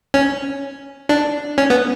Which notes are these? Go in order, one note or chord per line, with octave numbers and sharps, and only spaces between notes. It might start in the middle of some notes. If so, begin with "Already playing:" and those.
C#4
D4
C#4
B3